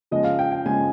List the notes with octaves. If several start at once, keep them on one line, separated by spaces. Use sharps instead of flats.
C#3 F3 G#3 D#5
F5
G5
G5
C#3 F3 G#3 G#5